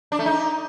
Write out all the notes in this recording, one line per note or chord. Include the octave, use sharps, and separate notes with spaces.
D4
A3
D#4